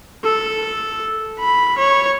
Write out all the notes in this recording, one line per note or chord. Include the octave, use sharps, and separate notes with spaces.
A4
B5
C#5